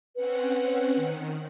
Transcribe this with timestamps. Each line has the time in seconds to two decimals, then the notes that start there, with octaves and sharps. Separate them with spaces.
0.16 C4 C#4 B4 F#5
0.96 D#3